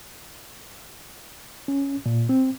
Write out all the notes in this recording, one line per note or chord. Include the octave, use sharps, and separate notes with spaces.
C#4
A#2
C4